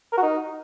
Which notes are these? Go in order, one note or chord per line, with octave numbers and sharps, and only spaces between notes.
A#4
F#4
D#4